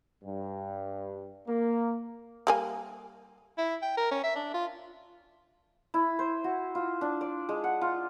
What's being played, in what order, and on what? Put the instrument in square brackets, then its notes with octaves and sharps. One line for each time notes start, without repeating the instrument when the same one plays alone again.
[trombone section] G2
A#3
[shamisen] G3 A#3 G#5
[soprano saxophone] E4
G5
A#4
C#4
E5
D4
F4
[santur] E4
C5
F#4
F4
D4
D5
G#3
F#5
F4